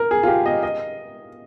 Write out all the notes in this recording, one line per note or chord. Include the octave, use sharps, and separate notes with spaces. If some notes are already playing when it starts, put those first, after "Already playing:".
Already playing: A#4
G#4
F4
G4
D#5
D#5